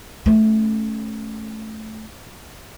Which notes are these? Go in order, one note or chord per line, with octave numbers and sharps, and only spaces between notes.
A3 C#4